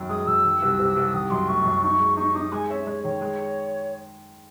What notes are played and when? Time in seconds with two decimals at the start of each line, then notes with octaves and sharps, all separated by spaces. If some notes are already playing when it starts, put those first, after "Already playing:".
Already playing: F#2 D#3 F#3
0.09 G#3 D#6
0.27 F#2 E6
0.44 D#3
0.62 C2
0.79 C3
0.96 C2
1.14 D#3 D#6
1.30 F#2 C6
1.48 A3 C#6
1.65 F#2
1.83 D#4 C#6
2.00 G#3
2.17 D#4 C#6
2.34 D#4 D#6
2.52 G#3 G#5
2.69 C#4 E5
2.86 G#3 C#5
3.04 D#3 C#5
3.21 G#3